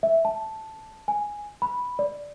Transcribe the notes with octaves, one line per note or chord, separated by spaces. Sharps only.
E5
A5
G#5
B5
D5